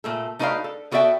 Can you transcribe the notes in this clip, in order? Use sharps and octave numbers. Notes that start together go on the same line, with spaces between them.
A#2 A3 A4
A3 D#4 F#4 B4 D5 F5
A4
B3 F#4 A4 D5 E5 G5